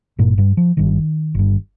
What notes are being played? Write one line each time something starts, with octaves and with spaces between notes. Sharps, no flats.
G1 G2 A#2 A#3
G2 G3
F3
G1 G2 D#3
G1 G2